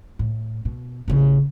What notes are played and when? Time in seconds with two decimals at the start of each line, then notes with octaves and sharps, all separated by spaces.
0.19 A2
0.65 B2
1.08 A1 C#3